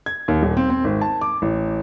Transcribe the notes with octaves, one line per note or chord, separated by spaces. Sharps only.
G#6
D#2
D#1
C4
C4
G#1
A5
D6
A1